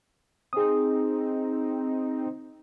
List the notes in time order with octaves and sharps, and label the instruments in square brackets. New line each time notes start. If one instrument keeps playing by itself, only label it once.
[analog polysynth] C4 D#4 [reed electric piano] G#4 D#6